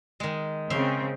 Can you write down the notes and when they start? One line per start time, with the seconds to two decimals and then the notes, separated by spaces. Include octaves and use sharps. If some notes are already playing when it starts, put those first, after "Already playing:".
0.20 D#3 G#3
0.70 C#3 C4 C5 E5 F5